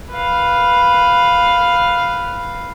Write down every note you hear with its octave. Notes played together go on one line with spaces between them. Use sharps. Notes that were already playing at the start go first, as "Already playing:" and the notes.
B4 F5